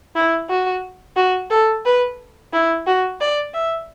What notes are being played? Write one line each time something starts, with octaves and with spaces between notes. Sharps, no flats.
E4
F#4
F#4
A4
B4
E4
F#4
D5
E5